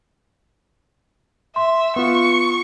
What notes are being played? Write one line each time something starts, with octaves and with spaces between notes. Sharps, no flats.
E5 C6
B3 F4 C#6